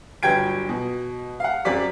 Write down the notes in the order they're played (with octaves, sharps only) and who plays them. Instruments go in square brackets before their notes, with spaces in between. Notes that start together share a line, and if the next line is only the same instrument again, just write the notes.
[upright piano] G1 F#3 G5 G#6 D7
B2
F5 F#5
F#2 C4 D5 D6 B6